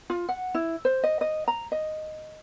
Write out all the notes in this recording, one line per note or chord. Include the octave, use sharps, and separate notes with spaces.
F4
F#5
E4
C5
D#5
D#5
A#5
D#5